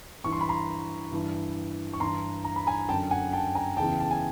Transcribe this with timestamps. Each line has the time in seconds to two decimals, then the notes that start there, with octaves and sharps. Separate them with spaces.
0.24 G2 E3 C#6
0.32 C6
0.41 B5
0.49 A#5 C6
1.12 G2 E3
1.93 C#6
2.00 G2 E3 A#5 C6
2.45 A#5
2.56 B5
2.67 G#5 A#5
2.89 F#2 G5 A5
2.93 D3
3.11 F#5 G#5
3.33 G5 A5
3.55 G#5 A#5
3.77 E2 C#3 E3 G5 A5
4.00 A5
4.11 G#5